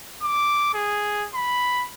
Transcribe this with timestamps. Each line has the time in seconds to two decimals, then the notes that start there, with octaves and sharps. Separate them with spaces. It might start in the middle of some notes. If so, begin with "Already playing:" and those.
0.22 D6
0.74 G#4
1.34 B5